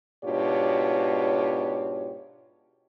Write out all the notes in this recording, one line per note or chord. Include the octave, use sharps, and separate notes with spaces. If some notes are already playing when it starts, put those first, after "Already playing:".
G#2 B2 D4 F4 G4 C#5